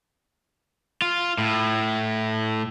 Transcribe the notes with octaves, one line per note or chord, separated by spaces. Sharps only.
F4
A2